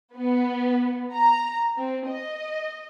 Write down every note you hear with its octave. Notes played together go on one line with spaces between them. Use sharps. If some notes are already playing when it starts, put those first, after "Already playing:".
B3
A#5
C4
D#5